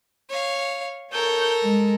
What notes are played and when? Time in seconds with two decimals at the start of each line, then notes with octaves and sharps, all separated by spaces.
0.29 C#5 F5
1.12 A4 A#4 C#5 G6
1.63 G#3